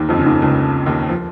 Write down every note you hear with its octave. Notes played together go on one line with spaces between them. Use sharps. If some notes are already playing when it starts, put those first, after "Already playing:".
Already playing: D#2 D#3
F2 F3
C#3
D#2 D#3
C#2 C#3
D#2 D#3
F3